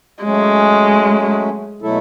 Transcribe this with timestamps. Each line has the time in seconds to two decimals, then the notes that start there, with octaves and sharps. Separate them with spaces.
0.23 F#3 G#3 A3 C#4
1.82 B2 F#3 A3 E4 A4